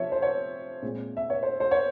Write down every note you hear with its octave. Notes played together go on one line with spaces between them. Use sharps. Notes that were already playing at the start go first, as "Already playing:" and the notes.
Already playing: C3 F3 C4 C#5 E5
C5
C#5
A#2 G#3 C4
E5
C#5
C5
C5
C#5